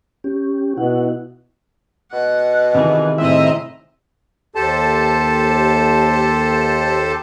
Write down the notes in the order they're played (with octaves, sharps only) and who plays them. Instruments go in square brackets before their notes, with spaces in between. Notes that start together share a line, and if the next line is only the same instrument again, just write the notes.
[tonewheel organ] C#4 G4
[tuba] B2 [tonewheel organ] E4 F#5
[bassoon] B2 [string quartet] F#5
[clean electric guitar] C3 D#3 G#4 [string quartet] E3
[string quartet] A2 D#5 A#5 [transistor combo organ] C4 E4 E5
[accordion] D#2 G4 A4 C5 A5